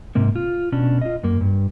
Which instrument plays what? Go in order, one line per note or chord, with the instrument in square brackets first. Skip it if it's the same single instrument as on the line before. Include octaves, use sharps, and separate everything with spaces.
[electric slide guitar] G#2 C3 A#3
F4
B2 C#4 D4
F4 D#5
F#2 A#3
G2